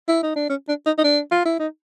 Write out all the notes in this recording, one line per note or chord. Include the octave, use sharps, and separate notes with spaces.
E4
D#4
D4
C#4
D4
D#4
D#4
D4
F4
E4
D#4